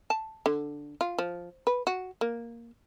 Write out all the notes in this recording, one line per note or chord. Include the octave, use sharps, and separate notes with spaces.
A5
D3
F4
F3
B4
F#4
A#3